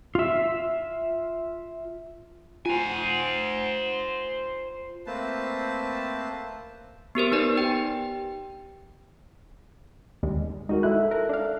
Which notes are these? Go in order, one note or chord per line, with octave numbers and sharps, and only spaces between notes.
F4 E5
F4 C5 G#5
A3 A#3 C4 B4 C5 A5
B3 G4 A#4 C5
B3 D#4 B4 D5
G4 G5
D#2 G3 G#3
G#3 D#4 F#4 A#4
G#3 E4 A4 E5 F#6
A#4
D4 F5